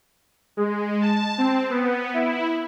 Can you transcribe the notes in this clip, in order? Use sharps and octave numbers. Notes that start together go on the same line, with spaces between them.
G#3
A5
C4
B3
E4